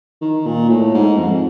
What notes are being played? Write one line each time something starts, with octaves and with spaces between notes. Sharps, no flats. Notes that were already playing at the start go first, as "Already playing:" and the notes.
D#3
A#2
A2
G#2
F2